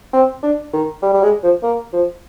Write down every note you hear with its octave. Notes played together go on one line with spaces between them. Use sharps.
C4
D4
D#3
G3
G3
G#3
F3
A#3
F3